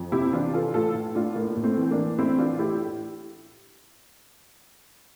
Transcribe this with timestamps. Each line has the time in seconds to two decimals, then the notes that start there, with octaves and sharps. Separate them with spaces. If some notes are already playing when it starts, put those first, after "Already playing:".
Already playing: F2
0.12 C3 E4 G4
0.33 E3 D4 F4
0.53 E3 F4 A4
0.74 A2 F4 A4
0.95 A2
1.15 A2 D4 F4
1.36 A2 A#3
1.57 A2
1.64 A3 C4
1.77 E3
1.91 A#3 D4
1.98 E3
2.18 A2 C4 E4
2.38 E3 D4 F4
2.59 A2 E4 G4